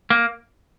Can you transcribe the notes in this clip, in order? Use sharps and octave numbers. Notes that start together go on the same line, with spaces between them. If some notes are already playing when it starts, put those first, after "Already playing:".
A#3